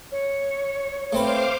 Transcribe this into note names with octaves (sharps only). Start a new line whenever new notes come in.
C#5
A3 C4 B4 C5 F5 D6